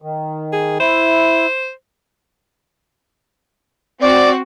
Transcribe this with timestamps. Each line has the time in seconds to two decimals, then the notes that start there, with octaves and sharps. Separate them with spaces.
0.02 D#3
0.53 G#4
0.80 E4 C5
4.01 C4 F#4 D5